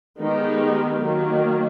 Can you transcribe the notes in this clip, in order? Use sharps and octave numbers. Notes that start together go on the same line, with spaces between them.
D#3 G#3 B3 D#4 G4
D#3 F#3 A#3